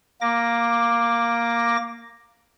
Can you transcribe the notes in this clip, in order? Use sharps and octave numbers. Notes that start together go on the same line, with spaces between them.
A#3 D6 A#6